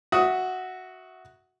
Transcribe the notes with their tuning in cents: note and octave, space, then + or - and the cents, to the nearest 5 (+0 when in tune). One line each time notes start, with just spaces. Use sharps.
F#4 +0 E5 -10 D#6 +10